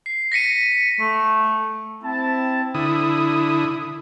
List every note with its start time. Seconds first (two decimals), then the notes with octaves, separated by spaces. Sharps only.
0.06 C7
0.32 A#6 B6 C#7 D#7
1.01 A3
2.03 C4 E4 A5
2.74 D3 E4 D#6